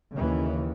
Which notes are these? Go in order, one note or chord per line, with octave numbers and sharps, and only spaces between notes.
D#2 C#3 E3